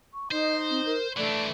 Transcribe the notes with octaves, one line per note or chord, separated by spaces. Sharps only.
C#6
D#4 C5 D#5
C4
A#4
E3 A3 D4 D5